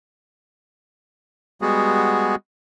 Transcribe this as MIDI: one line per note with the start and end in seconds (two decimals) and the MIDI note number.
1.62 2.35 55
1.62 2.35 56
1.62 2.35 59
1.62 2.35 66
1.62 2.35 68